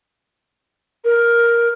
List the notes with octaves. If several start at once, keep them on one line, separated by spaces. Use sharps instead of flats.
A#4